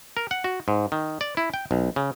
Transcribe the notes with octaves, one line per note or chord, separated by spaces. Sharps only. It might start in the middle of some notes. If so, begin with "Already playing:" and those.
A#4
F#5
F#4
G#2
D#3
D5
E4
G5
B1
C#3